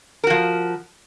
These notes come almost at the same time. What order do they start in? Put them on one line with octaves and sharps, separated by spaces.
A#4 F#4 F3